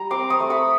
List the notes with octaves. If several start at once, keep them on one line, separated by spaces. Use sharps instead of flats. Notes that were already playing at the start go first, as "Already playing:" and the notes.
Already playing: G3 A#5
C4 C6 D6
C#6 D#6
A3
B5 C#6